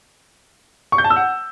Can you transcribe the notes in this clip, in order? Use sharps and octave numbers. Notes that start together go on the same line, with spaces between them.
C#6
G6
A5
E6
F#5